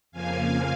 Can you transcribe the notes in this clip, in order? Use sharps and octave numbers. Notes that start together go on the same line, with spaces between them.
F2 C#3 F3 A#3 F5 G#5